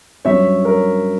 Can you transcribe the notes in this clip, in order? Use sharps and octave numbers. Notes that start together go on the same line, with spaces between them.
G2 F#3 C#4 C#5 E5
A#4 C#5